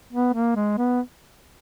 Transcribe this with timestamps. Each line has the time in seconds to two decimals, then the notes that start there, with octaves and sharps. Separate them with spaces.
0.13 B3
0.34 A#3
0.56 G#3
0.78 B3